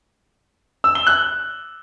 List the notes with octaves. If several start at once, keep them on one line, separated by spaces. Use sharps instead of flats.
E6
G7
F#6